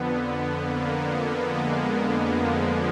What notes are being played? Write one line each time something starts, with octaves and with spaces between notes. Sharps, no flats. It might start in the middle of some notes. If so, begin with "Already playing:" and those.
Already playing: F2 D3 B3
A#3
G#3
F3